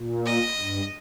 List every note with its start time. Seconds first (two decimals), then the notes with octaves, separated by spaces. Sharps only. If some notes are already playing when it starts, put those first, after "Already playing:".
Already playing: A#2
0.26 D#5
0.58 G2